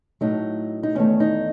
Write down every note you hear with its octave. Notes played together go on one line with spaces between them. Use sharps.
A2 F#3 A3 D#4
D#4
E2 D#3 A3 C#4
D#4